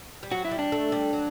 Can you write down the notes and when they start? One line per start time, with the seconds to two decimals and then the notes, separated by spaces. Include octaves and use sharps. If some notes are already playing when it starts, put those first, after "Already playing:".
0.23 G3
0.31 F#3 F#4
0.45 E4
0.51 G3
0.59 D4
0.72 A3
0.92 G3
1.13 F#3